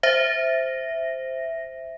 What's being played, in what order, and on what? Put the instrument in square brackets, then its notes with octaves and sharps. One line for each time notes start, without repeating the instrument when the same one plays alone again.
[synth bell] C5 E5 A#6